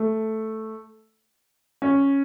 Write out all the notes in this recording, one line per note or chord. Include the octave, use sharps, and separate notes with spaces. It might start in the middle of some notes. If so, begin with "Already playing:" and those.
Already playing: A3
C#4